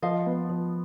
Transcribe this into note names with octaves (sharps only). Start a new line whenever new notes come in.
F3 D#5 F5
B3
F3